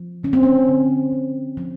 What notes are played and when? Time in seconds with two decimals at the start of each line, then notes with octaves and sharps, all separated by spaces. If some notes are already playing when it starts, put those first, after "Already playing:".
Already playing: F3
0.23 D3 C#4
0.33 C4
0.43 C#4
0.68 D3
1.12 D3
1.57 F3